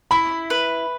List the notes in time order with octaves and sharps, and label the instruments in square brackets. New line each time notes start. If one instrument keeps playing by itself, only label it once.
[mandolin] E4 [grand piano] B5
[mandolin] B4